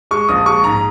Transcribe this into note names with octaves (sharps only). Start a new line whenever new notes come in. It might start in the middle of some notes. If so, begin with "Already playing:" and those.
G#3 C#6
A#1 D#6
G#3 C#6
G#2 A#5